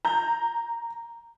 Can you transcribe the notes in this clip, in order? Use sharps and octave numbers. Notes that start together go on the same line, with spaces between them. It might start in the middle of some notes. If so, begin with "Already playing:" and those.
A#5 G6